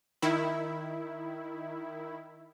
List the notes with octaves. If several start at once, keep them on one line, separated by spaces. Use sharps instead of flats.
D#3 E4